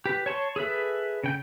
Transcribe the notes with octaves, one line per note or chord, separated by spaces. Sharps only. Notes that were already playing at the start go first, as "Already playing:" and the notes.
G4 B4
C#5 A5 C6 C#6
G#4 A4 B4 E5
C#3 G5 G6